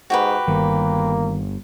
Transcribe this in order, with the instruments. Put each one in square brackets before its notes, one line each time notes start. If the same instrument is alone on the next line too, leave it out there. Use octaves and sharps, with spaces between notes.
[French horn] G#2 [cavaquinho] F#4 G4 B4
[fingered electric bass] G1 [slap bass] D#3 [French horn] A#3